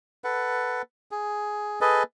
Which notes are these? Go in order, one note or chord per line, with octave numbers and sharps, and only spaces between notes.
A4 B4 F#5
G#4
G#4 A4 B4 D#5